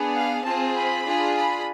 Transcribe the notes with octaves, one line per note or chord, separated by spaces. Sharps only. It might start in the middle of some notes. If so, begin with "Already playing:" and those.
Already playing: B3 D4 G#4
F5
C4 F4 G#4 A5
B5
D4 F4 G#4
B5